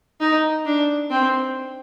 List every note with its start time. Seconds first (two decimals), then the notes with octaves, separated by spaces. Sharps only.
0.20 D#4
0.66 D4
1.10 C4